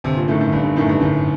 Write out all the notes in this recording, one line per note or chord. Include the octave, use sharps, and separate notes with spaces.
G1 C3
A#2
F#2 A2 D#3 A3
A2
G1 G2
G2
F#2 A2 D#3 A3
G2
G1 A2